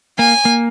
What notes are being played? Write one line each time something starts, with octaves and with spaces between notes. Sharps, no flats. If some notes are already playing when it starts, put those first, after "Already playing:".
A#3 G#5
A#3